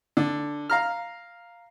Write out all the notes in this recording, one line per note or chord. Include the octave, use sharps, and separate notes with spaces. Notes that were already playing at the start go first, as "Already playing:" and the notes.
D3
F5 A#5 F6